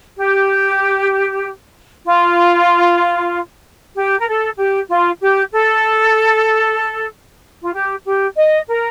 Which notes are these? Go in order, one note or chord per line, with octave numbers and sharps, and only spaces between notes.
G4
F4
G4
A#4
A4
G4
F4
G4
A4
F4
G4
G4
D#5
A#4